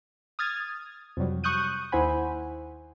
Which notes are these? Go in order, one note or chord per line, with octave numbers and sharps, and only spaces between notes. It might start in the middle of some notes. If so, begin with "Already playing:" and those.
D#6 F6 G#6 A6
F2 C3 F#3 G3
C#6 D#6 F#6 G6 D#7
D#2 E4 C5 F#5 G#5 B5